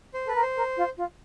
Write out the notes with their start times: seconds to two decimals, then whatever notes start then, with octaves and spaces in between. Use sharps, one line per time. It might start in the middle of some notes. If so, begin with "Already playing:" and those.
0.14 C5
0.25 A4 B4
0.35 A#4
0.42 C5
0.55 A#4
0.76 F4
0.97 F4